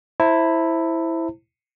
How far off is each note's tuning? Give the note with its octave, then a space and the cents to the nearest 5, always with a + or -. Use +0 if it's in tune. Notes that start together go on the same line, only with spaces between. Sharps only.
E4 +0 C5 +10 A5 +45